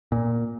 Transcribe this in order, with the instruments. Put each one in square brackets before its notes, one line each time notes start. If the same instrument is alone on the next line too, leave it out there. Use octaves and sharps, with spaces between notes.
[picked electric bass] A#2